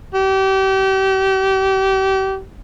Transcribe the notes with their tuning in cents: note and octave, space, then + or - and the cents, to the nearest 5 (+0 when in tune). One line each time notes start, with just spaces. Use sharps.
G4 -30